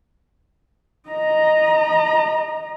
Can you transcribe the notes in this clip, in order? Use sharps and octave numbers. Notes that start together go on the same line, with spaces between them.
D#5 A#5